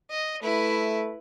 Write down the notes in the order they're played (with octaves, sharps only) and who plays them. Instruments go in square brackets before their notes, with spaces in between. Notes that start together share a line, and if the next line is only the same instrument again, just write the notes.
[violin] D#5
[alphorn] A3 [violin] E4 B4